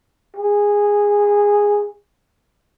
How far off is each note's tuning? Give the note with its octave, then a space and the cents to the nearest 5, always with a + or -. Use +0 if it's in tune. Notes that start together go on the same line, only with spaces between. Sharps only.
G#4 -15